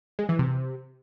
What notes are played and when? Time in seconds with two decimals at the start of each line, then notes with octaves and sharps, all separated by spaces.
0.19 G#3
0.29 E3
0.39 C3